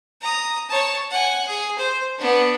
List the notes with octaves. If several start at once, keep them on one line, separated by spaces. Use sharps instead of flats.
A#5 D#6
C#5 A5
F#5 G#5
G#4
C5
B3 D4